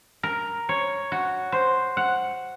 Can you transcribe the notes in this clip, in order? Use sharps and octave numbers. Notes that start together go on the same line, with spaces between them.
A#4
C#5
F#4
C5
F#5